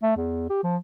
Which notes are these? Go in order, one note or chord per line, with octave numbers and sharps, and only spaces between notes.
A3
E2
G4
F3